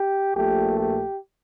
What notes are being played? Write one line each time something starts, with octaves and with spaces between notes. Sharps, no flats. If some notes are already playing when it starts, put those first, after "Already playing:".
Already playing: G4
A#1 A#2 A3 G4
G4